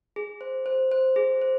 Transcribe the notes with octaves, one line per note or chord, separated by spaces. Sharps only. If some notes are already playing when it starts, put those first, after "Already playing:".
G#4
C5
C5
C5
G#4
C5